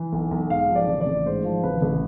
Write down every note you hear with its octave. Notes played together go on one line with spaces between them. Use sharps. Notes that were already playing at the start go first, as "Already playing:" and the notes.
Already playing: E3
B1
B1
G#2 F5
F3
D5
A1
D5
A1
G#2 C5
F3
A1 B4
A1